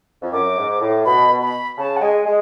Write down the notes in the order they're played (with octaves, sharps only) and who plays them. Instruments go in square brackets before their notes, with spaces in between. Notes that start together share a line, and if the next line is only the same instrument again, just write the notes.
[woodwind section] F2
[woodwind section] F#2 [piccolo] D6
[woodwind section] G#2
A2
[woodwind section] B2 [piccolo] B5
[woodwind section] B2
[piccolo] B5
[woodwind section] C#3 [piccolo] A5
[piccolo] F#5
[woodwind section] G#3 [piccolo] G#5
[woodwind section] G#3